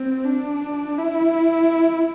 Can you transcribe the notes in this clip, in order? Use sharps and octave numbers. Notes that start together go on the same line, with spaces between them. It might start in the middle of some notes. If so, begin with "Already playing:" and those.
Already playing: C4
D4
E4